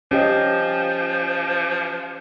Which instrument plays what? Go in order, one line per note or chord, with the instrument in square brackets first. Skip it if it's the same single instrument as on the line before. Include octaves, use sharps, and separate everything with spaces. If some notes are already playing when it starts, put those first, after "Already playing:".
[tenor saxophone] F3 [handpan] C#4 G4 D#5